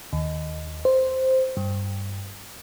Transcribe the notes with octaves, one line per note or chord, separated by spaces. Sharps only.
D#2
C5
G2